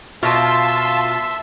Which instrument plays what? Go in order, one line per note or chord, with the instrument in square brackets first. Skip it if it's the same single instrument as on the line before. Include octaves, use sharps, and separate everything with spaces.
[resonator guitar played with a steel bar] B2 [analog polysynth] F4 [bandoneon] E5 [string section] A5 C6 E6